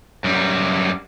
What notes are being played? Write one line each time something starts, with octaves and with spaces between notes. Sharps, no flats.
F#2 G3